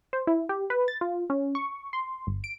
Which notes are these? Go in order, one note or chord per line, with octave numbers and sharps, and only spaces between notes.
C5
E4
G4
B4
A6
F4
C#4
C#6
C6
G1
D7